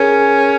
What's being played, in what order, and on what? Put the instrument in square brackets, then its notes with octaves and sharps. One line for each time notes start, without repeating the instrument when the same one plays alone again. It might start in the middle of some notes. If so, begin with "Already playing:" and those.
Already playing: [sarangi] C#4 [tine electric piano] G#4 A#4